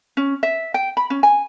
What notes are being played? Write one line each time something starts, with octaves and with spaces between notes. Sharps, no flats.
C#4
E5
G5
B5
C#4
G#5